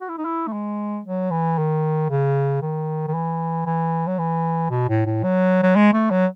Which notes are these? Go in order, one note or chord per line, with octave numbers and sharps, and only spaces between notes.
F#4
E4
D#4
E4
A3
G#3
F#3
E3
D#3
C#3
D#3
D#3
E3
E3
F#3
E3
B2
A2
A2
F#3
F#3
G#3
A3
F#3